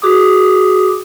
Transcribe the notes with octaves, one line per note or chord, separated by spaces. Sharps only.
F#4 G#4 D6 D#6